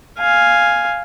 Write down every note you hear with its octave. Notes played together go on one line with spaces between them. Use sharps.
F5 G#5